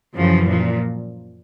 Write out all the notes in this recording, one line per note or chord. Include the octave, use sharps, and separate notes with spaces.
F#2 C#3 E3 F3
A#2 F3